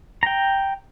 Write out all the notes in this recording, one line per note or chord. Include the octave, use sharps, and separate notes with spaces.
G5 A#5